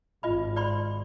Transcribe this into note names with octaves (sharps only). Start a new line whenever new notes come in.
G#1 F4 D#5 B5
D5 B5 C6